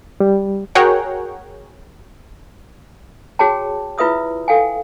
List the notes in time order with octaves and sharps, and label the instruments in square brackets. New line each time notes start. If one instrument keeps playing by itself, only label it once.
[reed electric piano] G3
[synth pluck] F#4 G#4 A#4 C#5 F#5 G5
[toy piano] F#4 G#4 C#5 G5 A5
E4 F4 B4 E5 D#6 E6
A4 F5 G5 G#5